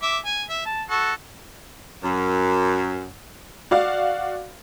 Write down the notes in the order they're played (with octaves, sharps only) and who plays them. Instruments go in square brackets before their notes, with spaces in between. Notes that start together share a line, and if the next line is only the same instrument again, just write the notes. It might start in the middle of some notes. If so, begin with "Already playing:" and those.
[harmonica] E5 D6
G#5
E5
A5
F#4 A4
[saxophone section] F#2
[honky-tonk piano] F#4 D5 F5